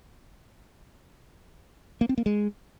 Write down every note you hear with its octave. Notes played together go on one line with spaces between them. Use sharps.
A#3
C4
A#3
G#3